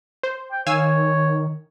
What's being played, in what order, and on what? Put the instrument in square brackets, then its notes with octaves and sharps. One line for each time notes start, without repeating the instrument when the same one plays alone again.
[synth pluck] C5
[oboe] G5
[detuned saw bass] D#3 [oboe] C#5 [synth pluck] F5 G#5 E6